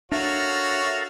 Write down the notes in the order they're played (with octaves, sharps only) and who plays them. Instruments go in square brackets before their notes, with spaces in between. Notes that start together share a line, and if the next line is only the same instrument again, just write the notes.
[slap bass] D4 [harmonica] F#4 C#5 [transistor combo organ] A4 A#4 F5 [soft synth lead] E5